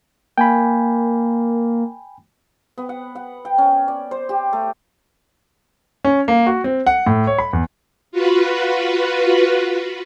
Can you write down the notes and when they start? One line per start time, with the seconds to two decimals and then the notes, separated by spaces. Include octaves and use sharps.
0.38 A#3 G5 G#5 B5
2.78 B3
2.89 F#5
3.15 F#5
3.45 G5
3.58 C#4
3.88 D5
4.11 C5
4.29 G4
4.53 A3
6.05 C#4
6.28 A#3
6.47 F#4
6.64 C4
6.86 F#5
7.07 A2
7.27 C#5
7.38 B5
7.53 E2
8.12 F4 F#4 B4